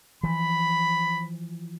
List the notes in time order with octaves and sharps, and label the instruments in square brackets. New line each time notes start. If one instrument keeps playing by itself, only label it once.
[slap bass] E3 F3 [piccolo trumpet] B5